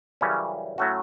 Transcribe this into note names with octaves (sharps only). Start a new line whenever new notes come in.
F#2 C#3 E3 G3 C#4
A2 F#3 A3 C#4 F#4